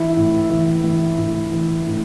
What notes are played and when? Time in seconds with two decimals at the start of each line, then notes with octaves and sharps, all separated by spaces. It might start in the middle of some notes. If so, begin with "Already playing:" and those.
Already playing: E3 E4
0.17 A2
0.50 E3
0.84 E3
1.18 A2
1.52 E3
1.87 A2